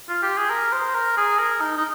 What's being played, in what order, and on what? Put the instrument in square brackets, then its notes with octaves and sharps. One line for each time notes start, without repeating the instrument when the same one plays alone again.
[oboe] F4
G4
G#4
A#4
C5
A#4
G#4
A#4
D#4
D#4